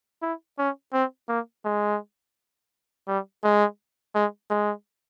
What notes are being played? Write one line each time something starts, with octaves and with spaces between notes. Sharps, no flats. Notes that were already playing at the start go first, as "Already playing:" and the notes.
E4
C#4
C4
A#3
G#3
G3
G#3
G#3
G#3